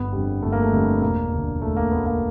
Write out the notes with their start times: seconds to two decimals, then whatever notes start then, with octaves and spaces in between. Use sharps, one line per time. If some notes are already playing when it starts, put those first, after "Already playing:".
Already playing: G1 B3
0.13 F2 D3 G3
0.42 G1 A3
0.52 A#3
0.63 A3
0.72 F2 D3 G3
1.02 E1 A#3
1.32 D2 D3
1.62 E1 A3
1.76 A#3
1.91 D2 D3 B3
2.06 A#3